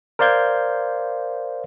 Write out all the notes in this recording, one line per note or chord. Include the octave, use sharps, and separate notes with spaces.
A#4 C5 D5 F5 G6 G#6